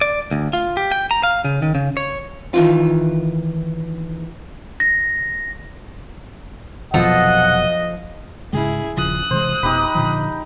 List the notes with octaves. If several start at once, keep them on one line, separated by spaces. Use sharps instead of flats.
D5
D2
F4
G4
G5
A#5
F5
C#3
D#3
C#3
C#5
D#3 E3 F4
A#6
F1 B2 F3 F#3 A4 D#5 F#5
G#2 C#3 G#3 E4 G#4
D#1 C#3 F3 D#6 F#6
C3 E3 G#3 C5
F1 B2 D#4 G4 B5
A#2 D3 F3